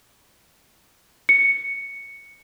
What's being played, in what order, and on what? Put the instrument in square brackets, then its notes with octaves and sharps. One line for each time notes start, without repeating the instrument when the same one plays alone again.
[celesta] C#7